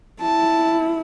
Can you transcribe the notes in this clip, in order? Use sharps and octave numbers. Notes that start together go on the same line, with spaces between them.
E4 A5